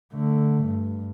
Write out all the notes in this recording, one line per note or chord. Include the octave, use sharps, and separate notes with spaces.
D3 A3
G2